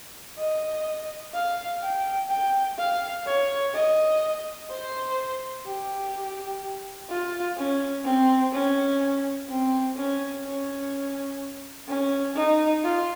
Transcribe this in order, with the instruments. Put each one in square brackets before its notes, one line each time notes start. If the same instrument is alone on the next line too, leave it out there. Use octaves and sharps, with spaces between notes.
[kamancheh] D#5
F5
G5
G5
F5
C#5
D#5
C5
G4
F4
C#4
C4
C#4
C4
C#4
C#4
C#4
D#4
F4